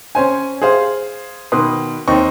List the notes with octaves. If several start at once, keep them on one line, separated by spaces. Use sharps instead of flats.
C#4 C5 G#5
G#4 C5 F5
B2 D#3 B4 C6 D#6
D#2 C4 D#4 C#6